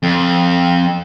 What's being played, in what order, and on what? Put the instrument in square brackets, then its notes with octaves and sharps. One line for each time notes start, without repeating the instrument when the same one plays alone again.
[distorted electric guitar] F2